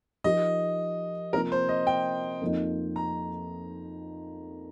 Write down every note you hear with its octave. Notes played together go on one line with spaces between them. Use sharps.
F3 D#4 G4 A#4 D#5
C3 F3 A#3 F4 A#4
C5
D#5
G5
F2 F3 A#3 D#4
A#5